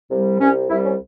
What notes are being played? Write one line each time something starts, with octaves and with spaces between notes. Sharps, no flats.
C2 C3 G3
C2 C3 G3 C#4
C2 C3 G3 E4
C#4